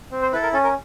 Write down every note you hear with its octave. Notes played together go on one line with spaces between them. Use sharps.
C4
C5
E4 A4 B4
A#4
C#4 A4
A#4